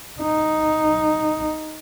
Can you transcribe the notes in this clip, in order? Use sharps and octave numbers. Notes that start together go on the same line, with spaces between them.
D#4